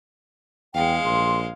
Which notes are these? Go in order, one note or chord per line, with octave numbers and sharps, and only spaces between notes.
E2 G#3 F5 G5
A#1 C6